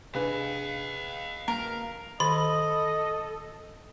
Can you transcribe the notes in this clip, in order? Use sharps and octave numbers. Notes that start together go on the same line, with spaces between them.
C3 D4 G#4 B4 D#5 F5
D1 F#2 A#3 A#4
D#3 A4 D#5 B5